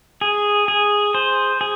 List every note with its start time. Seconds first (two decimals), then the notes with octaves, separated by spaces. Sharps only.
0.21 G#4
0.68 G#4
1.15 C5
1.61 G#4